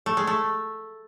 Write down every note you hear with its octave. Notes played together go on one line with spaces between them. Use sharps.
A3
G#3
A3